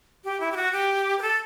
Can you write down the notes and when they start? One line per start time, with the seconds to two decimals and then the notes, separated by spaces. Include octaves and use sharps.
0.25 G4
0.40 E4
0.52 G4
0.57 F#4
0.73 G4
1.19 B4
1.22 A4